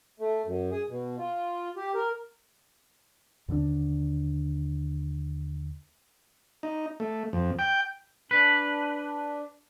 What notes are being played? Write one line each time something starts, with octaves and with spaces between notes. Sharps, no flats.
A3
F#2
G#4
B2
F4
G4
A#4
D#2 D3 A3 D4
D#4
A3
F2
G5
D4 B4